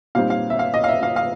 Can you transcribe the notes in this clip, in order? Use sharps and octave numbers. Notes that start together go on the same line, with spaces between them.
A#2 G3 C4 D#4 F5
F5
E5
F5
D#5
F5
E5
F5
F5